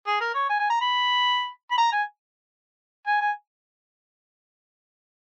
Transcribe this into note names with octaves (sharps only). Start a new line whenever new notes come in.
G#4
A#4
C#5
G#5
G#5
A#5
B5
B5
A#5
G#5
G#5
G#5